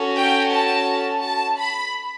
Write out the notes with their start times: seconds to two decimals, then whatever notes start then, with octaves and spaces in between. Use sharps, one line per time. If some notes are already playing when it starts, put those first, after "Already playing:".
Already playing: C#4 F#4 A4
0.18 G5
0.53 A5
1.23 A5
1.58 B5